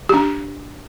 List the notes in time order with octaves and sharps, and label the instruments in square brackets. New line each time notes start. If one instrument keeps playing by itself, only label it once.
[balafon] D4 G4